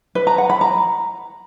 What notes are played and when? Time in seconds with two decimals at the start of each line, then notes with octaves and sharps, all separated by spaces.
0.15 B4
0.27 A#5
0.38 F#5
0.50 B5
0.61 A#5